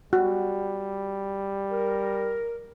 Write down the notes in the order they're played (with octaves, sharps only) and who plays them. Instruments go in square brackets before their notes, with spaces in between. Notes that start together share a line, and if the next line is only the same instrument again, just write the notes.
[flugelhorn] G3 [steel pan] F#4
[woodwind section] A#4